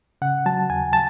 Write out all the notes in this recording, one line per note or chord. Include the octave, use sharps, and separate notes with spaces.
C#3 F#5
F#3 A5
D#2 G#5
A5